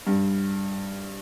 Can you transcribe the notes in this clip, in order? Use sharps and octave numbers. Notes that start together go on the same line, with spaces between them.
G2